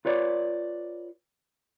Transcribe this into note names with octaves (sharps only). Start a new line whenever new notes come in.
F4 B4 C#5 D5